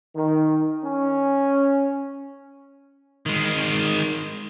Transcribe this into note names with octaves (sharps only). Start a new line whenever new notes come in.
D#3
C#4
D#3 G#3